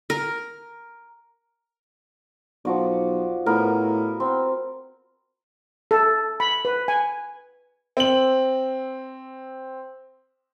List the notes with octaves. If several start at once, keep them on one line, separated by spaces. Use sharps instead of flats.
A#4
B1 F3 F#4 D5
A2 B3 A#4
C4
A4
B5
B4
G#5
C4 F#7